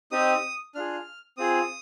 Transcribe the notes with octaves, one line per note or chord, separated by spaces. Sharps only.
C4 D#4 G4 D#6
D4 F4 G#4 F6
C4 F4 G#4 D#6